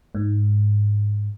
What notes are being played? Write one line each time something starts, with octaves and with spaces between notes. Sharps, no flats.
G#2